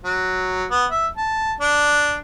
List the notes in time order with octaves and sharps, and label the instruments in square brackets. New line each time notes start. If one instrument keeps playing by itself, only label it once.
[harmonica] F#3
B3
E5
A5
D4